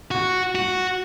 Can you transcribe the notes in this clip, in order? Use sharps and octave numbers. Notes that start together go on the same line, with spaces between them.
F#4
F#4